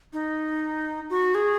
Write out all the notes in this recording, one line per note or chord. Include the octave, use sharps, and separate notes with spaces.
D#4
F#4
G#4